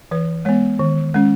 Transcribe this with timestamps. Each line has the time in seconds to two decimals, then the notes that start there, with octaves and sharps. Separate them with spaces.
0.11 E3 B4
0.45 G#3 B3 C#5
0.79 D#3
1.14 G#3 C#4